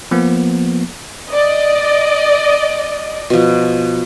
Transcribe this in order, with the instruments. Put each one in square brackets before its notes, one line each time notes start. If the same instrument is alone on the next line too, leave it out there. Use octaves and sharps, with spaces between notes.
[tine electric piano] F3 A#3 B3
[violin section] D5 D#5
[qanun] B2 F3